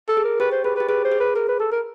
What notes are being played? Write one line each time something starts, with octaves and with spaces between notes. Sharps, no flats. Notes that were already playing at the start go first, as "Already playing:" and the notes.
A4
G#4
A#4
G4 B4
C5
G#4 B4
B4
G4
G#4 B4
C5
G#4
B4
A#4
B4
A4
A#4